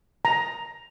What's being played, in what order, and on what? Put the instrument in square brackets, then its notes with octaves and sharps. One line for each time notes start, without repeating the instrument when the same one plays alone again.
[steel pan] A#5